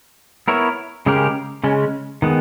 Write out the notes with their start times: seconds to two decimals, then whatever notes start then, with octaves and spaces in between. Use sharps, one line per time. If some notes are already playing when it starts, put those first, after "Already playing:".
0.48 B3 E4 A#4 C#5
1.06 C#3 G#3 C#4 G4 A#4
1.64 C#3 G#3 C#4
2.22 D#3 G#3 B3